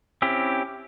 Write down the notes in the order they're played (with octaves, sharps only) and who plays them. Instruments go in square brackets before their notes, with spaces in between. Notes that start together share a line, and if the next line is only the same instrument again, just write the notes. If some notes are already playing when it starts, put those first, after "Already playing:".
[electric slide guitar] C4 C#4 E4 G4